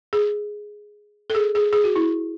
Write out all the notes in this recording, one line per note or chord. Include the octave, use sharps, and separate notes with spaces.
G#4
A4
G#4
G#4
G#4
F#4
E4